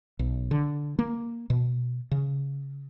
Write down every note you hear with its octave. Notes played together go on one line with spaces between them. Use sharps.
B1
D3
A#3
B2
C#3